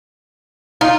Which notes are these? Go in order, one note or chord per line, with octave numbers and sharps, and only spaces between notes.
D#4 F4